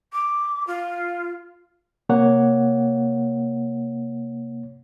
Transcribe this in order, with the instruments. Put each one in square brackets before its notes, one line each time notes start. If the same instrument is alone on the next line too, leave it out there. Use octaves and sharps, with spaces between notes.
[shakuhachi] D6
F4
[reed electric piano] C3 A#3 C#5 F#5